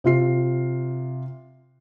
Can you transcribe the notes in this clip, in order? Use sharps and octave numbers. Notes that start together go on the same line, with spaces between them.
C3 F4 C7